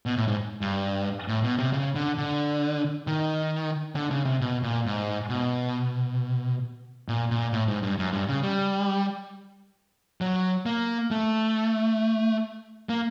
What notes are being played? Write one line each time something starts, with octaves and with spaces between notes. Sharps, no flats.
B2
A2
G#2
G2
A2
B2
C3
C#3
D3
D3
D#3
D3
C#3
C3
B2
A#2
G#2
B2
A#2
A#2
A2
G#2
G2
F#2
G2
C#3
G3
F#3
A#3
A3
A#3